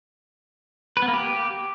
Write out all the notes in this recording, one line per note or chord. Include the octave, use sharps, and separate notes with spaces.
B4
B3
A#3
G4